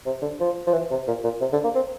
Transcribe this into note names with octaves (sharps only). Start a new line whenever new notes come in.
C3
D3
F3
F3
E3
C3
A#2
A#2
C3
D3
A#3
C4